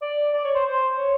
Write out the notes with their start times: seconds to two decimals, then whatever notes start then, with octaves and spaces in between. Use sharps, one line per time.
0.02 D5
0.34 D5
0.44 C#5
0.55 C5
0.66 C5
0.98 C#5